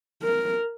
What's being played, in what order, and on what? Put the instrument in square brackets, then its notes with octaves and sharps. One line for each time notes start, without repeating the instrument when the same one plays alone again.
[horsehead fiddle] A#4